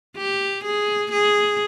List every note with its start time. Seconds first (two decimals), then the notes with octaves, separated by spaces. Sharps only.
0.17 G4
0.64 G#4
1.12 G#4